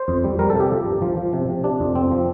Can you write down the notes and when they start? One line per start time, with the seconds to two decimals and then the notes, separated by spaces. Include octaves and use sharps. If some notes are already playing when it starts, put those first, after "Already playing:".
Already playing: C5
0.08 F2
0.24 G3
0.39 G3 A#4
0.50 A4
0.55 C3
0.60 G4
0.71 F3
0.86 G2
1.02 F3
1.17 F3
1.33 C3
1.49 C3
1.64 C3 D4
1.80 F2
1.95 F3 C4
2.11 F3